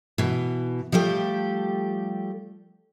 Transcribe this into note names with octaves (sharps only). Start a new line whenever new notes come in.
B2 E3
F3 G3 A3 G4